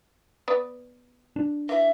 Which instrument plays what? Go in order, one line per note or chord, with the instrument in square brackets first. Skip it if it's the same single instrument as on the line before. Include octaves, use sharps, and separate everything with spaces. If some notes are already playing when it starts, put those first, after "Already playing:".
[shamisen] B3 B4 D5
[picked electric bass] D4
[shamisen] E3 [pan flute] E5